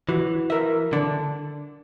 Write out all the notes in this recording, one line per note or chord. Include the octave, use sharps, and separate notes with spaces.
E3 F#4
A#4 E5
D3 D4